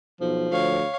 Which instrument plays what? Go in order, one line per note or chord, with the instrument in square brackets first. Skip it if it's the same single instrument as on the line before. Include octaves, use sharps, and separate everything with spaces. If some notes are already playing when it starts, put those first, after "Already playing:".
[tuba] B1 [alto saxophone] F3
[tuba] D2 [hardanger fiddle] C#5 F5